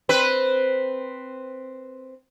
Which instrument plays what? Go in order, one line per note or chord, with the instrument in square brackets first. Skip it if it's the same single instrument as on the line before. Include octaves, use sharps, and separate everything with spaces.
[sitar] C4 B4